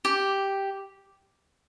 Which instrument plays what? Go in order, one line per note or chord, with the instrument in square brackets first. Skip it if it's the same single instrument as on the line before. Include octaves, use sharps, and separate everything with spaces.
[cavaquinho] G4